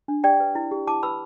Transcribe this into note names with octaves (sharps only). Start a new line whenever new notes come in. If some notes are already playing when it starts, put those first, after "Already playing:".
D4
G4 D5 G5
B4
E4
G4
E4 A5 D6
B4 B5 E6